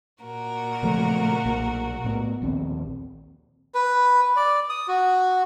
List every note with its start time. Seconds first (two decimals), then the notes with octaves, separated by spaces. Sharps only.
0.22 A#2 F#4 A#4
0.83 C#3 F3 A3
1.45 B1 A#3
2.04 A2 B3
2.42 A#1 D#2 C4
3.74 B4
4.37 D5
4.69 D#6
4.88 F#4